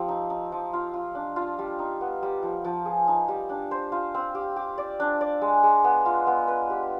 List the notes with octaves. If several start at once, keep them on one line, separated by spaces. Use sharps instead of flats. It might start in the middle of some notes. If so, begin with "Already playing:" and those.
Already playing: F3 C4 G4
D#4
D#4
F3
F4
F4
D4
F4
G3
D#4
B3
G3
F3
F3
G#4
D#4
G3
D4
C5
F4
C4
G4
G4
D5
D4
D5
G#3
G#3
B3
F4
B3
B4
G4